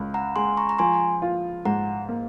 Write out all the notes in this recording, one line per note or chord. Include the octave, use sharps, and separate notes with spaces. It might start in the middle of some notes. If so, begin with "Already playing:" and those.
Already playing: C#2
F#5 A#5
G#3 G#5 C6
A#5 C#6
A#5
F3 G#5 C6
F4
G#2 F#5 A#5
A#3